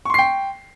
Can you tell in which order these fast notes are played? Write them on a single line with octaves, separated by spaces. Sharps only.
C#6 C6 C7 G5